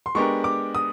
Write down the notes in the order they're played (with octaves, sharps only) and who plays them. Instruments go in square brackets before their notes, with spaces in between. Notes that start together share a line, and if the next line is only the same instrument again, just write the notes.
[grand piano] C6
[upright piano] G#3 B3 D4 G4 A#4 [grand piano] C#6
[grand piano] D6
D#6